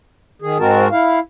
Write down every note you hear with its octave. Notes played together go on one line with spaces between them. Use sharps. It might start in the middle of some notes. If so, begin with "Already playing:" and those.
D#3 G#4
G#2 G#3 C4 F#4 A#4 A5
E4 F5